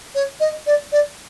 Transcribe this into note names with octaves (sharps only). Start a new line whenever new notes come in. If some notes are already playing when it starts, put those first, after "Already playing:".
C#5
D#5
D5
D5